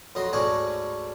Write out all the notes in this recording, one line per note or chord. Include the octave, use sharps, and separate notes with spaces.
F2 F#3 D#5 C6
D2 G#2 C#4 D4 G#5 C#6